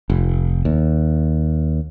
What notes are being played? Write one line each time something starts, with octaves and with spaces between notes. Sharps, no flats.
F1
D#2